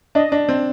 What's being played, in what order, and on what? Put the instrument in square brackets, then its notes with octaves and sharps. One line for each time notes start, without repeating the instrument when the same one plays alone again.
[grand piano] D4 [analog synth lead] D#5
[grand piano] D4
C4